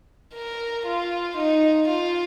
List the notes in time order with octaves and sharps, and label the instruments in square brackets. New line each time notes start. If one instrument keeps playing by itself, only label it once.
[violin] A#4
F4
D#4
F4